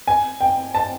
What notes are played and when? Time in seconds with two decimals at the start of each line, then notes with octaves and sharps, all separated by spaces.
0.07 G#5
0.41 G5
0.75 A5